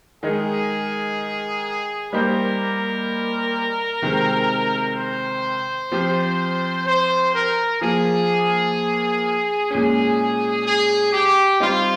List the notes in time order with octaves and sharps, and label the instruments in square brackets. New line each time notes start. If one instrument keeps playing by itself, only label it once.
[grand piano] D#3 G#3 D#4 A#4 [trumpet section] G#4
[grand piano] G3 A#3 D#4 G4 C5 [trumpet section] A#4
[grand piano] C3 D#3 G#3 C4
[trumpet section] C5
[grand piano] F3 C4 G4
[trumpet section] C5
A#4
[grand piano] F3 A#3 F4 [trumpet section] G#4
[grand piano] A#2 G#3 C#4 [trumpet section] G#4
[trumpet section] G#4
G4
[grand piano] G3 C4 D#4 [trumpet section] F4